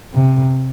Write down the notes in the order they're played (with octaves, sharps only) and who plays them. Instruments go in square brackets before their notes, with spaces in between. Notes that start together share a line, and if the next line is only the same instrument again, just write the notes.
[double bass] C3